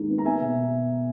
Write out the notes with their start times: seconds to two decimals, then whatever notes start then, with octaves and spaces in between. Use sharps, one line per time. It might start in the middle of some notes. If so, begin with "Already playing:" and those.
Already playing: D#2 G#2 D#3 G#3
0.10 B3
0.18 A#5
0.25 B3 E5 G#5
0.41 B2